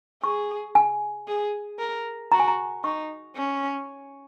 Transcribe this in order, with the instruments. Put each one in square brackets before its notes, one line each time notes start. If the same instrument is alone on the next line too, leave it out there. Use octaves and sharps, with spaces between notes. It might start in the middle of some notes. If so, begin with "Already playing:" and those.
[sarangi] G#4 [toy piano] C#6
[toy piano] G#5
[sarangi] G#4
A#4
[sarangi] F#4 [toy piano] A#5
[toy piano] G#5
A#5
[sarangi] D#4 [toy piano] C#6
[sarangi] C#4